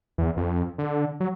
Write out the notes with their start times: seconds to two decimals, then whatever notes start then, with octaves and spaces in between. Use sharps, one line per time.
0.18 E2
0.37 F2
0.78 D3
1.20 F#3